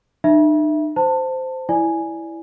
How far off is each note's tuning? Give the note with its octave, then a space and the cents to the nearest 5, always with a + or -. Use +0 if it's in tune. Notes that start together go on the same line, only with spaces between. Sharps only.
D#4 -45 E5 +0 B5 -45
C5 -10 A5 +20
E4 +0 D5 +0 G#5 +0